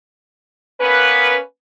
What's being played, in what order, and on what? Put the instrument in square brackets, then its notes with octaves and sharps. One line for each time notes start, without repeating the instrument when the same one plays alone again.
[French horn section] A#3 B3 C#4 B4